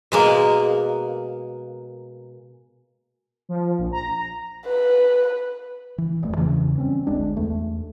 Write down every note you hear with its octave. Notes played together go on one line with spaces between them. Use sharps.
B2 G#3 A#3
F3
A#1
A#5
B4
E3
D#1 F2 A3
E2 G2 C#3 E3
G3 C4 C#4
G1 D2 G#3 D4
E2 A3